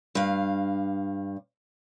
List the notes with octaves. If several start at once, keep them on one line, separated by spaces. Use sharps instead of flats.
G2 F5